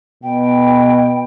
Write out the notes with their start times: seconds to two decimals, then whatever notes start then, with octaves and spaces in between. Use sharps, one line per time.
0.23 B2 G5